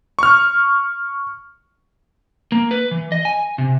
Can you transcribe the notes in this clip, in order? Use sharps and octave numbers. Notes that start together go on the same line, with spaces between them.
C#6 F6
A#3
B4
E3
D#5
G#5
C3